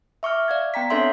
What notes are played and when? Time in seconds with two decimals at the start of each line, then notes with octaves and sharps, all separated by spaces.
0.23 E5 C#6 D6 F6
0.48 D5 F5 G#6
0.74 B3 G5 A#5 B6
0.90 C4 D4 A4 C#5 E5 C6